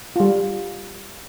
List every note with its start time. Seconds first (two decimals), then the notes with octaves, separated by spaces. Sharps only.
0.16 G3 F4